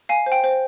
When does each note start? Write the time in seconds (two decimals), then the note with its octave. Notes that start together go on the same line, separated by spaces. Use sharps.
0.09 F5 G#5
0.26 C5
0.32 G5
0.44 C5